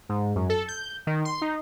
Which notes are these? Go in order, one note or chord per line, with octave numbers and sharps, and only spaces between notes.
G#2
F#2
A4
G6
D#3
C6
D#4